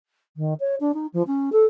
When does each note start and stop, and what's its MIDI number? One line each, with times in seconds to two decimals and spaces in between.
0.36 0.54 51
0.60 0.75 73
0.80 0.92 62
0.94 1.07 63
1.13 1.22 53
1.27 1.50 61
1.52 1.65 69